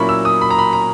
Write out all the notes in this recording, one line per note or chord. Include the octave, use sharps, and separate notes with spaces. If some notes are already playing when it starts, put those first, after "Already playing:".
Already playing: A#2 F#3 A#3 C#4 E4 B5 C#6
E6
D#6
B5
A#5
B5
A#5